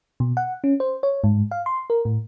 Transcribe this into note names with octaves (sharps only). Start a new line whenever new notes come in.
B2
F#5
C#4
C5
C#5
G#2
F5
C6
A#4
A2